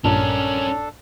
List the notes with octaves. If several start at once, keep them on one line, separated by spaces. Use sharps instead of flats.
A#1 G2 A#2 C#4 D4 A4 A#4